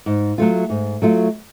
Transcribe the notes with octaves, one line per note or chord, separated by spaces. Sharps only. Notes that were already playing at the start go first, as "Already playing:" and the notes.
G#2
F#3 A3 F4
G#2
F#3 A3 F4